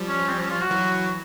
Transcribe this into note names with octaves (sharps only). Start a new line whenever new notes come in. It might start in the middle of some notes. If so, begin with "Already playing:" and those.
Already playing: F3 G3
C#4
C4
C#4
F4
F#4
E3 F#3